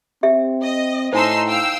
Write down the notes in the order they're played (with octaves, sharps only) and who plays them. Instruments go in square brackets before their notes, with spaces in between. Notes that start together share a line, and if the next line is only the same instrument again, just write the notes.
[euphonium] C4 [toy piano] G4 E5
[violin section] D#5
[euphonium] A2 [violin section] D#4 C6 E6 [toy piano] C5 G#5 A5
[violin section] F5 G5 E6